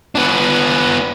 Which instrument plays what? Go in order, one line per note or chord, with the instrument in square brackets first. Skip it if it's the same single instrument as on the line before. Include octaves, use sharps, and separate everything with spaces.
[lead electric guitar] B3 D4